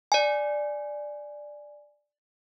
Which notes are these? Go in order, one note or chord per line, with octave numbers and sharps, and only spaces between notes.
D5 G#5